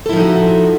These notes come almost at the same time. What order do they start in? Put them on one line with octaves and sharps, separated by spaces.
A4 E4 F3 D#4 F#4